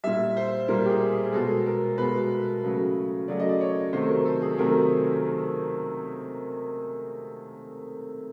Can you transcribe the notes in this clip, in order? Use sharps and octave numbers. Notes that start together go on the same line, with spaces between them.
A#2 G3 E5
C5
A#2 G3 A#4
G4
G#4
G#4
B2 G#3 A4
A#4
B2 G#3 B4
C#3 F#3 A3
C#3 F#3 A3 D5
D#5
D5
C#5
C3 D#3 F#3 A3 C5
A#4
A4
G#4
C3 D#3 F#3 A3 A#4